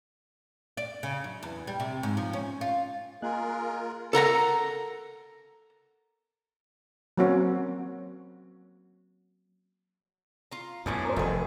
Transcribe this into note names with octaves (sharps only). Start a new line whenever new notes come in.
D5
C#3
F#2
E2
G3
C3
G#2
F3
C#4
F4
A#3 F4 G#4 A#4 D#5 F#6
A4 A#4 F#5 A#5
F#3 A#3 C4 C#4 F#4 C#5
F4 A#5
F#2 A2 B3 C#4 D4
A#4 C5
F1 D#3 G#4 A4 B4